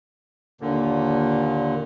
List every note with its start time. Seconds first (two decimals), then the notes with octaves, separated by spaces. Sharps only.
0.61 D#2 A#2 D3